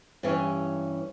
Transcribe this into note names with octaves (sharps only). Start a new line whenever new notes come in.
G2 E3 C#4